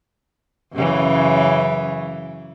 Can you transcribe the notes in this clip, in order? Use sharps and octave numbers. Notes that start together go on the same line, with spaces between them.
F#2 C#3 E3